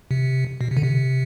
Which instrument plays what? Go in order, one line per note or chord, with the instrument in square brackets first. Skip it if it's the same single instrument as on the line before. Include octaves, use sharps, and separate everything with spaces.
[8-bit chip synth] C3
B2
C3
D3
C3